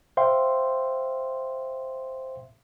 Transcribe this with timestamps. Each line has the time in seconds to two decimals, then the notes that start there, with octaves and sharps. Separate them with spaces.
0.17 C5 E5 F5 G5 C6